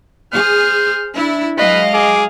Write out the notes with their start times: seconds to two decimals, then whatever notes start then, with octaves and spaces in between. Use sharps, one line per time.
0.33 G#4 C5 F6
1.15 D4 E4
1.58 F#3 G#3 B4 D#5 F5
1.93 G#4 D6